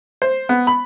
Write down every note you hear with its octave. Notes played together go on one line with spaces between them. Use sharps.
C5
B3
B5